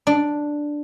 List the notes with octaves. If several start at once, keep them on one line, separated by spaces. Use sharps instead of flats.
D4